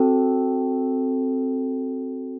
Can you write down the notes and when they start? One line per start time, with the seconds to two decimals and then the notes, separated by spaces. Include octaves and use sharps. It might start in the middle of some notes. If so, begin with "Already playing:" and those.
Already playing: C4 F#4 A4